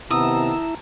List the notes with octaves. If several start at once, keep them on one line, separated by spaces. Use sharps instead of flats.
C3 D#3 B3 E4 A5 A#5 D#6 E6